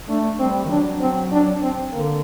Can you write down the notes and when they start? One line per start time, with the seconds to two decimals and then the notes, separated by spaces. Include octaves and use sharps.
0.09 A3 D4
0.39 G3 C4
0.65 D#3
0.70 F#3 D4
1.01 C4
1.32 D4
1.62 C4
1.93 D3 A#3